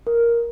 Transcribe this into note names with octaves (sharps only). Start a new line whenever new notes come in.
A#4